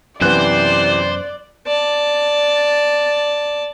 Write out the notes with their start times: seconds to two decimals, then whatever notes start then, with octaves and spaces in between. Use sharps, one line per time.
0.21 F#2 C3 E3 B3 C5 D5 F#6
1.67 D5 A5